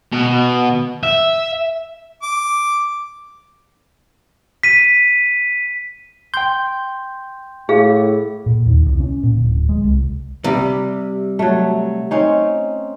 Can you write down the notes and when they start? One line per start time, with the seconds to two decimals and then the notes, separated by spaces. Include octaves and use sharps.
0.13 B2
1.03 E5
2.23 D6
4.63 B6 D#7
6.34 G5 C6 G6
7.69 A2 G#4 F5
8.46 A#2
8.66 D#2
8.86 C2
9.00 C#4
9.23 A#2
9.35 D1
9.69 G#3
9.84 C2
10.44 C3 G3
11.39 F#3 A3
12.11 C4 C#4 D#4